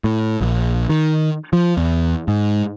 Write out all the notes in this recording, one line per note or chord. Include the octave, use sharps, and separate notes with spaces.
A2
A#1
D#3
F3
E2
G#2